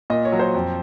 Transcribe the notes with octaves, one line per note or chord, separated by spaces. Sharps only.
A#2 D#5
C#5
F#3
C5
F2